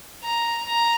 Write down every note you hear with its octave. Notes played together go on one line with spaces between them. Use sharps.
A#5
A#5